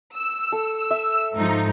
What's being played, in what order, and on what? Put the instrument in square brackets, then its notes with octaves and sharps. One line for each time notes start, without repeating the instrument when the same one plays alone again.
[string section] E6
[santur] A4
E5
[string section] G#2 F3 D#4